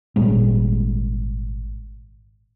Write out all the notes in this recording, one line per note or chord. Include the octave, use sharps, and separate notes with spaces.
G#1 A#2 G3 G#3